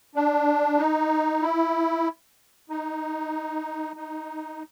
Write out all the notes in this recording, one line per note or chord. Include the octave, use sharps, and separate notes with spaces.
D4
D#4
E4
D#4
D#4